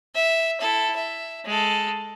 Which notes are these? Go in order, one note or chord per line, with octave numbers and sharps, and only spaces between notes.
E5
E4 A4
E5
G#3 A4